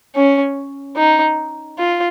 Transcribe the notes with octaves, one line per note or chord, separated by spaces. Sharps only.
C#4
D#4
F4